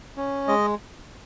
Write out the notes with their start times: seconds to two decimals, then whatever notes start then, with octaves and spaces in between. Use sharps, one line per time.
0.16 C#4
0.48 G#3 D#5